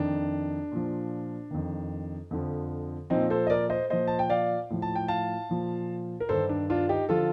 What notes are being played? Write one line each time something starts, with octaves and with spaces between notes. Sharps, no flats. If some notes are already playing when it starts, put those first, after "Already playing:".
Already playing: F2 D#3 D4
A#2 F3
F2 D#3
F2 D3 F3
A#2 F3 C4 D#4
A4 C5
D#5
A#4 D5
C5 D#5
A#2 F3 C5 D#5
A5
G5
D5 F5
A2 F3
A5
G5
F5 A5
A#2 F3
A#4
G2 D#3 A4 C5
D4
D4 F4
D#4 G4
D3 F3 F4 A4